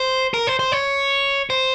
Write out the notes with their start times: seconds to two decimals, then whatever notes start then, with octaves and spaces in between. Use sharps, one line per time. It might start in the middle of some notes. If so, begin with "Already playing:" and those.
Already playing: C5
0.34 A#4
0.47 C5
0.59 C5
0.72 C#5
1.50 C5